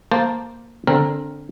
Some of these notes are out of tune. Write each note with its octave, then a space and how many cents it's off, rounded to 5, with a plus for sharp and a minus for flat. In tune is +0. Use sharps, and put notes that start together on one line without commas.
A#3 +0 C5 +0 A5 +0
D3 +0 C4 +20 A#4 +0